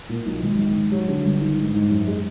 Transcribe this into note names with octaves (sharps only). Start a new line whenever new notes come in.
A#2
B1
G#1
G#1
G#1
F#3
D3
G1
D#3
G#2
G#2
F#2
G#3